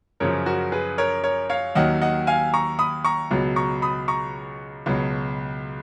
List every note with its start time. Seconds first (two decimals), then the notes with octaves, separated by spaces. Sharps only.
0.20 F#2 C#3 F3 A#4 C#5
0.46 F#4 A#4
0.72 G#4 B4
0.98 A#4 C#5
1.24 A#4 C#5
1.50 C#5 F5
1.75 D#2 D#3 F#3 D#5 F#5
2.02 D#5 F#5
2.27 F5 G#5
2.54 A#5 C#6
2.79 B5 D#6
3.05 A#5 C#6
3.31 C#2 B2 F#3
3.56 A#5 C#6
3.82 B5 D#6
4.08 A#5 C#6
4.86 C#2 B2 F#3